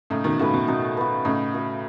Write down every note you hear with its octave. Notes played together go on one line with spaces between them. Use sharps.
A2 C#3 D#4
B2 D#3
A2 C#3 F#4 B4
B2
B2 D#4
F#4 B4
A2 C#3 D#4
F#4 B4